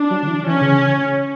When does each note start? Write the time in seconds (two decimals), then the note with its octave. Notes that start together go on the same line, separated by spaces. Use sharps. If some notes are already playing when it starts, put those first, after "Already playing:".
Already playing: D4
0.10 F#3
0.23 D3
0.28 E3
0.46 E3 C#4
0.61 C#3